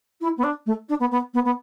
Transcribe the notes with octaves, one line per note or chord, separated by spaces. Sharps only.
E4
B3
D4
A3
D4
B3
B3
B3
B3